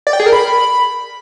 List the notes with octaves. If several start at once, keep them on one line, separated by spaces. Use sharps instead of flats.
D5
G5
G#4
A#4
B5